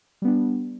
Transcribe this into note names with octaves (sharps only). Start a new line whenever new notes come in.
G3 B3 D4